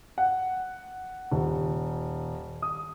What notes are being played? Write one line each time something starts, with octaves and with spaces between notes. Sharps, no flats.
F#5
D#1
D#6